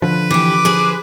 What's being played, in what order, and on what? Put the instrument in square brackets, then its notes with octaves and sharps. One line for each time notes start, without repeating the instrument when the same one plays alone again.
[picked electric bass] D3 F3 [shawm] B4
[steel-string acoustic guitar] E3 G4 [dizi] D6
[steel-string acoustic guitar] G#4 C5